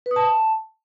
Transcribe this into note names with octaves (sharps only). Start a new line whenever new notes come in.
B4
D#6
A5